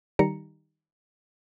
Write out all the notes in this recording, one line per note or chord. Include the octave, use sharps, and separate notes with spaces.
D#3 G3 A#5 C#7